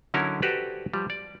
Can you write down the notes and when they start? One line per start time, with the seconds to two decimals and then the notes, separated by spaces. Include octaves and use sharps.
0.14 D3 F#3 C#4 D#4 E4 A#4
0.42 F#4 G4 A4 B4 C5 D5
0.93 F3 G3
1.10 D5